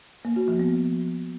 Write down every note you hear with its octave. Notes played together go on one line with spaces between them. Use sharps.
A#3
F#4
F3
B3